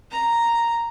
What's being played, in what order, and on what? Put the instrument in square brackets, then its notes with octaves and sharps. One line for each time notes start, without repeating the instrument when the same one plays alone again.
[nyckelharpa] A#5